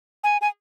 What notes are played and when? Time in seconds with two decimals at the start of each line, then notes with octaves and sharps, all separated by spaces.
0.24 G#5
0.41 G#5